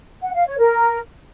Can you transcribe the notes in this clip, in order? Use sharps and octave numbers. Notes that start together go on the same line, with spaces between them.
F#5
F5
C#5
A#4